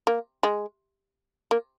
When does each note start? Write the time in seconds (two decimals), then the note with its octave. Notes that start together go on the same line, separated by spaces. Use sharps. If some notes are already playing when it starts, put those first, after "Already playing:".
0.07 A#3
0.43 G#3
1.51 A#3